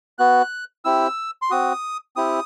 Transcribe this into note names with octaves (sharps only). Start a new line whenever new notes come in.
B3 F#4 F#6
C4 E4 G4 E6
C6
C4 F#4 D#6
C4 E4 G4 D#6